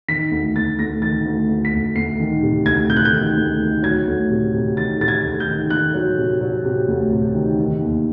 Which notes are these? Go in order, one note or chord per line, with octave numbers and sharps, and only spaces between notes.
D#3 B6
D2
D2 A6
D2 A#6
D#3 A6
D2
D2
B6
D2
D2 C7
D#3
C3
D2 G#6
C3 G6
F#6
G6
D#3
D2
D#3
F#3 G#6
D2
C3
C3
D#3 A6
C3 A6
G#6
D2
G6
D#3
D#3 F#6
F#3
C3
F#3
C3
D2
C3
D#3
D#3
D#2